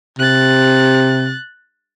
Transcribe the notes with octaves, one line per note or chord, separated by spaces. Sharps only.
C3 F#6 A6